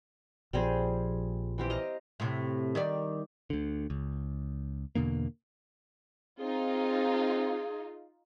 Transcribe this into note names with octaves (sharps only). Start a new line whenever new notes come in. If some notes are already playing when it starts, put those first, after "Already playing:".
A#1 F3 G3 C4 G#4
E3 C4 G4
D#5 F5 A#5
A2 C3
D#3 G3 D5
D2 D3
C#2
E2 B2 D3 A#3
C4 D#4 F4 G#4